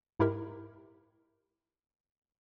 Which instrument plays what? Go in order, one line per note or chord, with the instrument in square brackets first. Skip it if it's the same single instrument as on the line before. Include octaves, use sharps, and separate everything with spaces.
[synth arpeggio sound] G#2 D#4 E4 G4 A#4 B5